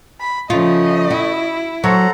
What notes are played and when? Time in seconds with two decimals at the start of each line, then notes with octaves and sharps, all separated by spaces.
0.21 B5
0.50 C#3 F3 A3 F4 D#5
1.10 E4 F#4
1.84 F#3 A4 C5 C#5 F#5 A#5